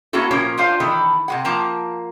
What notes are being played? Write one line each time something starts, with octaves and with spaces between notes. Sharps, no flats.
A#3 B3 C#4 E4 F#4 A4
A#2 F3 A#3 C#4 C#5 A#5
D4 F4 C5 F5
D#3 E3 B3 A4
C3 G#3 F#5
F3 A#3 A5 A#5